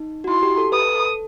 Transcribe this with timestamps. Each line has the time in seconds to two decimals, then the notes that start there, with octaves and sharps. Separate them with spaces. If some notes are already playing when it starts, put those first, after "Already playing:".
Already playing: D#4
0.24 F#4
0.28 E4 C6
0.43 G4
0.58 A4
0.72 B4 D#6
0.95 A4